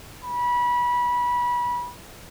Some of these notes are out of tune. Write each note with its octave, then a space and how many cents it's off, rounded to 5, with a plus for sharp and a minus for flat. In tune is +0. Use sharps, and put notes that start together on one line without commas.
B5 -25